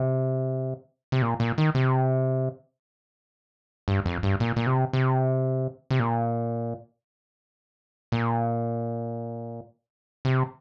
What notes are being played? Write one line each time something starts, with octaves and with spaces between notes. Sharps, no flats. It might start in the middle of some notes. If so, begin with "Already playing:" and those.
Already playing: C3
C3
A#2
A#2
D#3
C3
G2
F2
G2
A#2
A#2
C3
C3
C3
A#2
A#2
C3